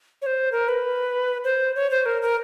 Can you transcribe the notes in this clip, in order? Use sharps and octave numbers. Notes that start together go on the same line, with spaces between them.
C#5
C5
A#4
B4
C5
C#5
C5
A#4
A#4